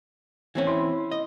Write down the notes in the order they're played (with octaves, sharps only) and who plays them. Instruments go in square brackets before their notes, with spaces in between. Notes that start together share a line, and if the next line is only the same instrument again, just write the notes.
[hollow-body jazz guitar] E3 C4 C#4
[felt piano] E4 C6
[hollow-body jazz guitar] D#5